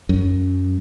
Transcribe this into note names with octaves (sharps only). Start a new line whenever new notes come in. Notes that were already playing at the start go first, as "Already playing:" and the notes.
F#2